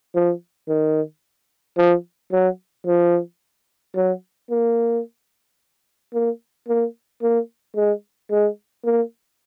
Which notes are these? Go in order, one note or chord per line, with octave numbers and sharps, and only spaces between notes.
F3
D#3
F3
F#3
F3
F#3
A#3
A#3
A#3
A#3
G#3
G#3
A#3